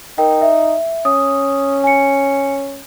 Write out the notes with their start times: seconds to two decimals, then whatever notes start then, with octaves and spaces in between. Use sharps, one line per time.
0.18 D#4 A#4 G5
0.41 E5
1.05 C#4 D#6
1.84 G#5 C#7